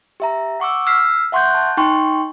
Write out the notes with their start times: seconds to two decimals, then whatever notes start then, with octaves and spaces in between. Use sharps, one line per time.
0.20 G4 E5 A#5
0.60 F#5 C#6 D6 E6
0.87 E6 F6 B6 C7
1.32 E5 F#5 C6 C#6 F#6 G6
1.51 A5 F#6
1.77 D#4 G5 C6 C#6